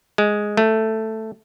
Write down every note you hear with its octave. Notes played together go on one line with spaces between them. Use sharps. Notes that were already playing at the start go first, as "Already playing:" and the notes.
G#3
A3